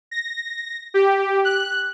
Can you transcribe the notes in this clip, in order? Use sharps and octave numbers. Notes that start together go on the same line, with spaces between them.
A#6
G4
F#6